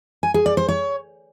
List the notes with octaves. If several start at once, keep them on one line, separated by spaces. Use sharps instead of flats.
G#5
G#4
D5
C5
C#5